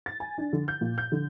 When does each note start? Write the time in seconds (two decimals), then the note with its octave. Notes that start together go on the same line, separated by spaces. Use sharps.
0.06 A6
0.20 G#5
0.38 D4
0.53 D3
0.68 G6
0.81 A#2
0.98 G6
1.12 D3